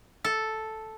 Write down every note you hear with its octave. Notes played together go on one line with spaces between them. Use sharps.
A4